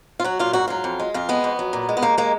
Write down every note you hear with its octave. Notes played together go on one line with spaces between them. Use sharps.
F4
F#3 F#4
A#2 F4
G#2 F#4
F#3 F4
F2
G#3
F2 F4
G#3 B3
F2
F#3
A#2
G#3
B3
D#2 A#3
G#3 A#3